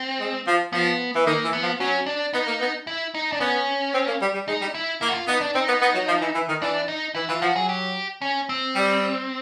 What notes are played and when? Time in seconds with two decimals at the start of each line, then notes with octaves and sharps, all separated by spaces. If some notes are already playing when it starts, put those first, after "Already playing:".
Already playing: C4
0.20 G#3
0.47 F3
0.73 F3 B3
1.15 E3
1.26 D#3 A#3
1.44 E3
1.53 B3
1.63 F3
1.80 F#3 C#4
2.06 D4
2.33 B3 D#4
2.47 A#3
2.60 B3
2.87 E4
3.14 D#4
3.32 D4
3.40 B3 C#4
3.94 C4
4.07 A#3
4.21 G3
4.34 G3
4.48 G#3 D#4
4.61 G3
4.74 E4
5.01 A#3 E4
5.09 F#4
5.14 F4
5.28 B3 D#4
5.41 D4
5.55 C4 D#4
5.68 B3
5.81 B3
5.95 F#3
6.08 F3
6.21 E3
6.35 E3
6.48 D#3
6.62 E3 D4
6.88 D#4
7.15 E3 E4
7.29 E3 F4
7.42 F3 F#4
7.56 F#3 G#4
7.69 G4
8.22 C#4
8.49 C4
8.76 G3